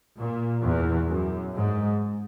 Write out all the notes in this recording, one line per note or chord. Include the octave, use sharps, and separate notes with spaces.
A#2
E2
F#2
G#2